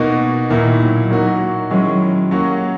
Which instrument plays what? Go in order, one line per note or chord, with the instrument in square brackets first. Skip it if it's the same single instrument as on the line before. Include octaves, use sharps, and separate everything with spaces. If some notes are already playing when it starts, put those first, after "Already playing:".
Already playing: [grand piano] B2 A#3 D#4 F#4
[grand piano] A#2 A#3 E4 [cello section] D#3
[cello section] F#3
[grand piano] F#3 A#3 D#4 F#4
[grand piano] D#3 G#3 C#4 E4 [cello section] F#3
[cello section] F#3
[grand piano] F#3 C#4 F#4 [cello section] A#3